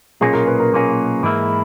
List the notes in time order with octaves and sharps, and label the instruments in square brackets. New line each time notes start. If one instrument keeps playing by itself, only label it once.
[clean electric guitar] B1 A#2 A#3 C#4 [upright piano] G#4
[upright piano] A#4
B4
A#4
[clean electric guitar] B1 A#2 A#3 C#4
G#2 E3 A#3 E4